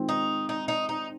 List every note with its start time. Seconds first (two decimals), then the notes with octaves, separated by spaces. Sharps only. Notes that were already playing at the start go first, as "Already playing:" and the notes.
Already playing: D#3 G#3 C4 F4
0.09 D#4
0.49 D#4
0.68 D#4
0.89 D#4